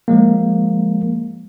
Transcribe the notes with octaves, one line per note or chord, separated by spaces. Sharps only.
F3 G#3 A#3